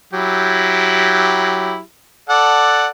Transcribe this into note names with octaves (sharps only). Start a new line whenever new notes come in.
F#3 E4 G4
A4 D5 F#5